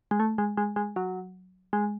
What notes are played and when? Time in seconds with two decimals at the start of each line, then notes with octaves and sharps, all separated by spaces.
0.11 G#3
0.20 A3
0.38 G#3
0.57 G#3
0.76 G#3
0.96 F#3
1.73 G#3